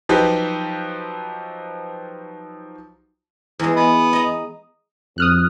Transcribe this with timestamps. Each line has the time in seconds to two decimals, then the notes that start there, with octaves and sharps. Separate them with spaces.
0.09 F3 F#3 D#4 G4 B4
3.59 E2 G#3
3.76 B3
4.13 D#5 A#5
5.18 F2 D#6 F6 F#6